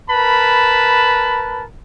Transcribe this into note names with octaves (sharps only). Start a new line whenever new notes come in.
A#4 B4 A5 B5